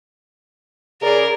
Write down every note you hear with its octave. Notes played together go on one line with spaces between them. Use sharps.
C#3 G#4 A#4 D5